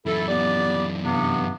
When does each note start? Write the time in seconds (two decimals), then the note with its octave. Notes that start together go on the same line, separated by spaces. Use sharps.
0.06 F#2 E3 E4 A4
0.28 B3 G4 D5
1.04 G2 C3 B3